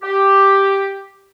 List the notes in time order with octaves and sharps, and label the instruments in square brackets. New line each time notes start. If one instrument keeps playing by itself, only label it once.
[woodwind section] G4